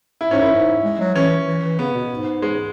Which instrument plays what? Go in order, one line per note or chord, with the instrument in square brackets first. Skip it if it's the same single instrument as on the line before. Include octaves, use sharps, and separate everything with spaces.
[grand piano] E4
[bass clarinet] G#2 [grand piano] C#4
[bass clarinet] F#2 [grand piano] E4
[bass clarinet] G#2
G#3
F#3
[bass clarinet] E3 [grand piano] C#4
[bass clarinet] E3
E3
[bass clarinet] C#3 [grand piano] B3
[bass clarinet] B2
G#2
[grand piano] G#3